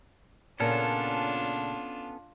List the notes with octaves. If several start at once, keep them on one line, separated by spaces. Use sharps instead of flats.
A#2 C#3 B3 C#4 D4 F4 A4 A#4